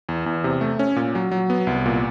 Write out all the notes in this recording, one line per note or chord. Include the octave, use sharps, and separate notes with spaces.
E2
E2
C3
A3
C#4
A#2
F#3
F#3
B3
C2
A#2